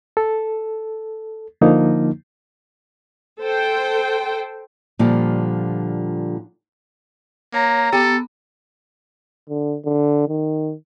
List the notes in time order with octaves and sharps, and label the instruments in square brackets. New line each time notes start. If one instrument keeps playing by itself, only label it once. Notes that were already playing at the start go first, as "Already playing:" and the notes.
[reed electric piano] A4
D3 F3 A#3 D#4
[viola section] A4 C5 G5
[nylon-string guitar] A#2 D3 F3 G3
[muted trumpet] A#3 [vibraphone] C#5 [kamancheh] A#5
[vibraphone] B3 [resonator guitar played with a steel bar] G4 [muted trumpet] A4
[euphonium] D3
D3
D#3